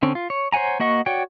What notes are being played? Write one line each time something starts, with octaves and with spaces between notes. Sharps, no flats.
D3 C4 C#4
F4
C#5
C5 C#5 F#5 G#5 A#5
A#3 F#4 D#5 F#5 C#6
F#4 C#5 D5 F#5 G5